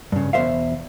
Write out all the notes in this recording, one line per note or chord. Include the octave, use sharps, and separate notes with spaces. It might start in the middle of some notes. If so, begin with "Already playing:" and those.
G2 C#3
E2 B2 A#3 C5 E5 F5